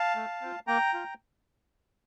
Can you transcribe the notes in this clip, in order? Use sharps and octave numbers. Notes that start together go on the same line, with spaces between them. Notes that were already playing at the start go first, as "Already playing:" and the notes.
Already playing: F5 A5
A3
C4 F4
A#3 G5 A#5
F4